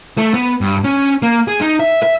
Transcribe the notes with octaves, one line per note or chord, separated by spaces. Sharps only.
A3
B3
G2
C#4
A#3
G#4
D#4
E5
E5